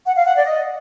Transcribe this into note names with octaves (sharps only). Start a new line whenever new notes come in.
F#5
F5
F#5
D5
D#5